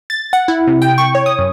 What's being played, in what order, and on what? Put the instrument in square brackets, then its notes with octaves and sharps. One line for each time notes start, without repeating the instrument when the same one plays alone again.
[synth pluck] A6
F#5
E4
C3
G5
C#6
C#5
D#6
F#2